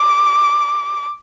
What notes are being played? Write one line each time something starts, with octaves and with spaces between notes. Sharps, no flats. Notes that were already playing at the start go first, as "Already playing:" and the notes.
Already playing: D6